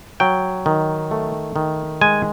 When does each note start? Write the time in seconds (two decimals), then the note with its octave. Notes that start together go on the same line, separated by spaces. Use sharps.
0.20 F#3 G5
0.66 D#3
1.11 A3
1.56 D#3
2.01 G#3 G#5